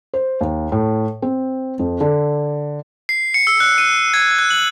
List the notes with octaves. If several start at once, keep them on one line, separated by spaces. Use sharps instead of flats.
C5
D#2
A2
C4
F2
D3
C7
C#7
E6
F#6
D#7
G#6
F#6
F#7